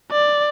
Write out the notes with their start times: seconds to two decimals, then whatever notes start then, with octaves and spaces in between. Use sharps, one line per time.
0.12 D5